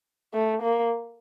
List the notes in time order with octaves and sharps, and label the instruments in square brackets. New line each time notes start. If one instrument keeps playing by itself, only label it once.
[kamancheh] A3
A#3